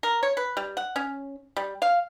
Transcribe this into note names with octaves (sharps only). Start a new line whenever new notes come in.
A#4
C#5
B4
G3
F#5
C#4
G3
F5